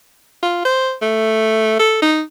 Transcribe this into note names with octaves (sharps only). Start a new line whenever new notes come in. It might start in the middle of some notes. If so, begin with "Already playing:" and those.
F4
C5
A3
A4
D#4